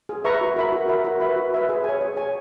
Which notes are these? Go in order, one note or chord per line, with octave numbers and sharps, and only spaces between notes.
G#4
B4 E5 A#5 C#6
F#4
A#4 E5 B5
F#4
A#4 E5 B5
F#4
B4 E5 B5
F#4
B4 E5 B5
G#4
C#5 G#5
G#4
C#5 G#5